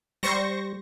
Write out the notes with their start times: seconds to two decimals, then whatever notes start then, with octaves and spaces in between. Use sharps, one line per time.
0.23 G3 C5 C#6 A#6